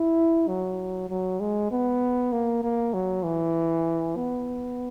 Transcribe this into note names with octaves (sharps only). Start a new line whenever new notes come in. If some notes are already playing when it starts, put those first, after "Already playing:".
Already playing: E4
F#3
F#3
G#3
B3
A#3
A#3
F#3
E3
B3